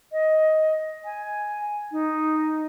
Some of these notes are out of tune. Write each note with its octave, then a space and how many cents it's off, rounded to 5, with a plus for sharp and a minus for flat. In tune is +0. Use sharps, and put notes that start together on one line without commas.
D#5 +10
G#5 +5
D#4 +0